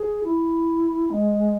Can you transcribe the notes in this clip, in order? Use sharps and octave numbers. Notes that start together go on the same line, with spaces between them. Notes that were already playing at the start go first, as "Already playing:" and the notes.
Already playing: G#4
E4
G#3